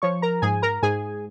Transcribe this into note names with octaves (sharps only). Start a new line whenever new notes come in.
F3 C#5 C#6
A#4 A#5
G#2 G#4 G#5
A#4 A#5
G#2 G#4 G#5